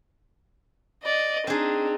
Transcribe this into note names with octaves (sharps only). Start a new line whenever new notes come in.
D5 D#5
C4 D4 D#4 G#4